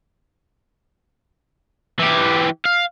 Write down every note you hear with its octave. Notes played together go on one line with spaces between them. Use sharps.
E3 G4
F5